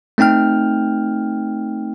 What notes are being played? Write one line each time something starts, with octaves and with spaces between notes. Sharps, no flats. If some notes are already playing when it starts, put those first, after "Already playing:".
A3 C4 D#4 G5 F6